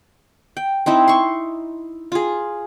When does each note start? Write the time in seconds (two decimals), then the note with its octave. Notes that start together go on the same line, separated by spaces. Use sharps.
0.57 G5
0.86 C4 D#4 E4
1.08 C6 C#6
2.12 F4 G#4